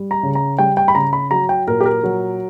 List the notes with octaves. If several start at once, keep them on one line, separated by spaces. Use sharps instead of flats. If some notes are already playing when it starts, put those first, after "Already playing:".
Already playing: G3
A#5
C#3
A#5
G3 G5
G5
B5
C#3 A#5
B5
F#3 A#5
G5
A#2 A#4
G4
A#4
F#3